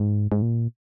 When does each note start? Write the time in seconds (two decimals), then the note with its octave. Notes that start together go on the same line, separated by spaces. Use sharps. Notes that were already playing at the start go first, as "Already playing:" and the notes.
Already playing: G#2
0.32 G#2
0.42 A#2